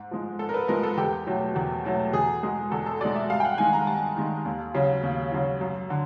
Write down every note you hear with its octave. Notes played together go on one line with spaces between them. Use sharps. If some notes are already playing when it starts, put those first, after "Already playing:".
Already playing: G#2
F3 G#3
G#2 A4
A#4
B4
F3 G#3 A#4
A4
E2 G4
B2 F#3 A3
E2
B2 F#3 A3
E2 G#4
B2 G#3 G#4
E2 A4
A4
B2 G#3 D5
E5
G2 F5
G5
F#5
D#3 G#3 G#5
A#5
G2 A5
D#3 G#3
D#2
C#3 F#3
D#2
C#3 F#3
F#2
D3